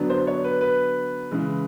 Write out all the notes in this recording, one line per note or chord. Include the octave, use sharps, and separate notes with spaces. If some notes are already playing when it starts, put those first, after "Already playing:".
Already playing: D3 F#3 B3 D4
C5
C#5
B4
B4
C#3 E3 G#3